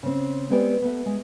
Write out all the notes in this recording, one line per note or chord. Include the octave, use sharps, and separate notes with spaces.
C#3 C4
G#3 B3 C4 G4 B4 D5
A3 B3
G#3